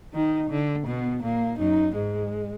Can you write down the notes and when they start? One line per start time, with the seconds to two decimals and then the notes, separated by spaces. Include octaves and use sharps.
0.14 D#3 D#4
0.50 D3
0.86 B2 B3
1.23 A#2 A#3
1.59 F#2 D#4
1.94 G#2 G#3